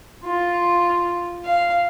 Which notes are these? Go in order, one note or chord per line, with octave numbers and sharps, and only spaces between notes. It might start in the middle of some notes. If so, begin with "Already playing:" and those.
F4
F5